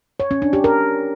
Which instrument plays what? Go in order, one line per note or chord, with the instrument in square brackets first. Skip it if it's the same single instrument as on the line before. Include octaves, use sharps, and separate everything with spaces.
[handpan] C#5
C#4
D4
G4
A#4